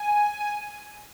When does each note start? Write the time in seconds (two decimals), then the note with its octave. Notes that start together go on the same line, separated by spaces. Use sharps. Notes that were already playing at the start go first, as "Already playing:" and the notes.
Already playing: G#5
0.41 G#5